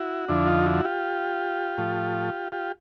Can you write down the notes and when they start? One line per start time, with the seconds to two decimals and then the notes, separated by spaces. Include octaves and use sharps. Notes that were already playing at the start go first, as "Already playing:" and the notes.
Already playing: E4 F#4
0.28 F2 D3 F3 D4 E4
0.47 D#4 F4
0.66 E4 F#4
0.84 F4 G4
1.78 A2 F3
2.52 F4 G4